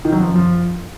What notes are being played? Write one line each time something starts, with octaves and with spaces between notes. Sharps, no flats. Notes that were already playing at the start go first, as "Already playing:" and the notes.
D#3
F#3
F3
F#2
F3